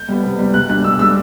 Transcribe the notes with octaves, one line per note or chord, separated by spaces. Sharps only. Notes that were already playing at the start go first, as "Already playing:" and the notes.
Already playing: G6
G3 B3
C3
G3 B3
B2 F#6
G3 D4 F#6
B2 E6
G3 D4 E6